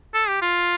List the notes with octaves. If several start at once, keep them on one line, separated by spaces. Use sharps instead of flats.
A4
G4
F4